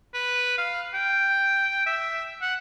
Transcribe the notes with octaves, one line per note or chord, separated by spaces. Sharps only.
B4
F5
G5
E5
F#5